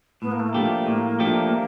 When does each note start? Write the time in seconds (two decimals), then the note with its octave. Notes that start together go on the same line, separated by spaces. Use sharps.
0.22 A2 B3
0.31 A#3
0.39 A3
0.48 A#3
0.54 F3 A3 D4 G4
0.87 A2
1.19 F3 A3 D4 G4